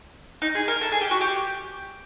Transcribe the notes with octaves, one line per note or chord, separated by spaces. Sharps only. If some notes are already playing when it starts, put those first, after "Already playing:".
D#4
G#4
A#4
A4
G#4
G4
F#4
G4